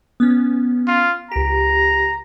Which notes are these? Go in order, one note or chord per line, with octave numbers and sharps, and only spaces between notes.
B3 C#4
F4
C#2 G4 A#5